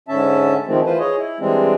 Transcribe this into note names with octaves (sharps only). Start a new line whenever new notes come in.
G#2 D3 C#4 E5 A5
G#2 D#3 F3 G#3 A3 C4
E3 F4 B4 C5
G#4 C#5 D#5
E4
E3 G3 G#3 C4 D4